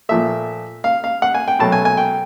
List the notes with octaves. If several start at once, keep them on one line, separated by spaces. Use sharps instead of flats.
A#2 F3 A3 E5
F5
F5
F#5
G#5
G5
B2 F#3 A3 A5
G#5
G#5
G5